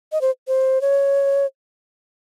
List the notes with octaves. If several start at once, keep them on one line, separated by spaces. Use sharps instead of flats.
D#5
C5
C5
C#5